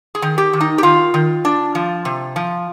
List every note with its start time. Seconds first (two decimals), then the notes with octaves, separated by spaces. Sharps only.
0.15 G#4
0.22 D#3
0.38 G4
0.53 D#3
0.61 D#4
0.78 G4
0.83 D#3 F4
1.14 D#3
1.45 D4
1.75 F3
2.05 C3
2.36 F3